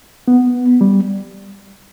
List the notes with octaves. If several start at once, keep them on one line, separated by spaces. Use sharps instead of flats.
B3
G3